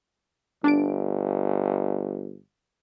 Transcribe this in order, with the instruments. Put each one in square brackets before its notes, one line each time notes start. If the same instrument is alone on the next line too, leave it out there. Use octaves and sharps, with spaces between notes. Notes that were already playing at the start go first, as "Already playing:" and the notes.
[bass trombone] G1 [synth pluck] D4 A5 D7